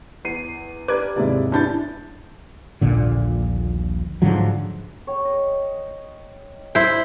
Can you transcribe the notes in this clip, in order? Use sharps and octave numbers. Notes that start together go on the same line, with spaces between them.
E2 C7 D#7
D4 G4 A#4 B4 D6 G#6
D#2 G#2 C3 E4 G#4 D5
E2 C#4 D4 E4 G6 A6
D#1 A#1 A#2 D3
G#2 D3 F3 F#3
C#5 G5
D#5
E4 C5